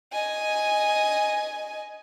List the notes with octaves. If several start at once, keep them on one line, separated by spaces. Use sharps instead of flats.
D#5 G#5